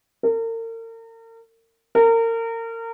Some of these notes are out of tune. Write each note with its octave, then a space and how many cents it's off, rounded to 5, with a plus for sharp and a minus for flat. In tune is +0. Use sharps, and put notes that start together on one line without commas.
A#4 -40
A#4 -30